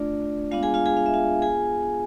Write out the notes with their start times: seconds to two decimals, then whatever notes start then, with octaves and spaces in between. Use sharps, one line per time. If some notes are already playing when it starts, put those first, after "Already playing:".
Already playing: A3 D4 F4 D5
0.51 G#3 B3 D4 F4 F5
0.63 G#4 G#5
0.74 F4 F5
0.86 G#4 G#5
0.97 F5
1.06 E5
1.14 F4 F5
1.42 B3 F4 G#4 G#5